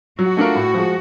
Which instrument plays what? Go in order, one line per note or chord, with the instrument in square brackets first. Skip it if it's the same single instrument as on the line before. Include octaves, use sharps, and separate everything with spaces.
[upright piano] F#3 [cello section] F#4
[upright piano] A3 D4 F4 A#4
A2
F3 G#3